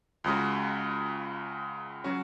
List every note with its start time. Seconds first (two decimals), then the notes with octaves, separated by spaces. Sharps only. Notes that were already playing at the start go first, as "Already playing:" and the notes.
0.24 C#2 C#3 G#3 F#4
2.04 F#3 C#4 F#4